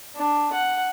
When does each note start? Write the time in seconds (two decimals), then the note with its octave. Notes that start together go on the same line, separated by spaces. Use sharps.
0.17 D4
0.53 F#5